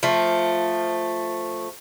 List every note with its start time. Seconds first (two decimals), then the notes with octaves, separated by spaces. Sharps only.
0.03 F3 A3